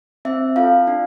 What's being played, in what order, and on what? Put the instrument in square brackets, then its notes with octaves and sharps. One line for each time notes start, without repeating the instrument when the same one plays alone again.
[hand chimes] C4 E5
F4 A4 F5
D4